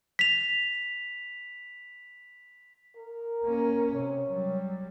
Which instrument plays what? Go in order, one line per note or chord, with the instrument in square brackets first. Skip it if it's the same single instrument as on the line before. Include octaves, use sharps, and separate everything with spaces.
[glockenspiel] B6 F7
[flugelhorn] A#4
[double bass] A#3 C#4
[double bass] C3 [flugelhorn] C#5
[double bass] F#3 G3